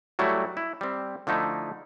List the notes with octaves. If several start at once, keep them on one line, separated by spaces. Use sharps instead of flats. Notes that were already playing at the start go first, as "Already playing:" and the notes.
F#3 G3 A3 E4 F#4
E4
G3 C4
D3 F3 A3 D#4 E4